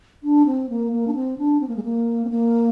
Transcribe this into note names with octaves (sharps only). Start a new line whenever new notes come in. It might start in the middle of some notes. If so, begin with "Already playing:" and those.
D4
C4
A#3
A#3
D4
C4
D4
C4
A#3
G#3
A#3
C4
A#3